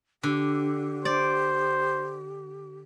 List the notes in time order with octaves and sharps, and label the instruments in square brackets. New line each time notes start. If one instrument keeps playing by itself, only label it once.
[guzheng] D3 [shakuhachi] G4
[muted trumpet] C5 [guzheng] D5